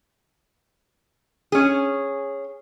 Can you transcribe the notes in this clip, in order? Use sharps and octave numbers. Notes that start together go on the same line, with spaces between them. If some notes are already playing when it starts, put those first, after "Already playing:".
C#4 G#4